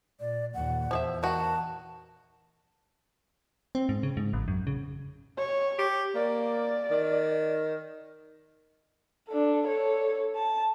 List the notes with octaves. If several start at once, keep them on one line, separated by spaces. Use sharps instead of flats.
A#2 D5
D#2 A#2 F#5
E2 F3 G#4 E5
D#3 F#4 A5
C4
G#2
C#3
G#2
A1
F#2
C#3
C#5
G4
A#3 D5
D#3
D4 A4
A4 C#5
A5